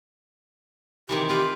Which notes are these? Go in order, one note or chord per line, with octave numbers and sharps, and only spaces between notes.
C3 D#3 E3 G4
C4 F4 G4 B4